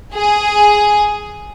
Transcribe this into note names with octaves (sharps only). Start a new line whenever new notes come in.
G#4